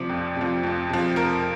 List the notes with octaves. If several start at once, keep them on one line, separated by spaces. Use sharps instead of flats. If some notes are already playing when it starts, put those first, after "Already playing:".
Already playing: C3 F3 D5
F2
C3 F3
F2
C3 F3
F2 A#4